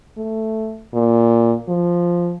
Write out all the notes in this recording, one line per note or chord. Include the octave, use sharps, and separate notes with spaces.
A3
A#2
F3